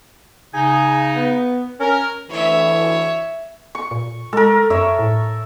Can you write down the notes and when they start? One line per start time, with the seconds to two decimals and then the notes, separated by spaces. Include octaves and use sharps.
0.54 C#3 D#4 G#5
1.16 B3
1.80 C#4 A#4
2.30 D2 E3 C#5 E5
3.75 C#6
3.91 A#2
4.33 G#3 A4 A#4
4.70 F#2 C#5 E5
4.99 A2